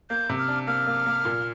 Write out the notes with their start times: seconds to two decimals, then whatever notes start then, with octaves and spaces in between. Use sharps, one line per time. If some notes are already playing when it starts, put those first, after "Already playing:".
0.10 A#3 G6
0.30 C3
0.39 F6
0.48 D4
0.67 A#3 F6
0.87 A#3
1.06 A#3
1.25 A#2